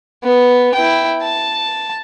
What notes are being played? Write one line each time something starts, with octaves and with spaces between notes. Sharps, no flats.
B3
E4 G5
A5